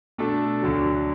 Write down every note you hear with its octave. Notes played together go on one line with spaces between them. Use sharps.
B2 A3 D4 A4
D2 D3 F#3